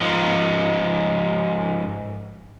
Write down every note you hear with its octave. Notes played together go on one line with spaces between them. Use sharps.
G#2 F3